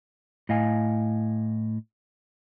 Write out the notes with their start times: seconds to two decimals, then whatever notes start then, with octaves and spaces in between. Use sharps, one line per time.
0.49 A2 D#5 F5 G#5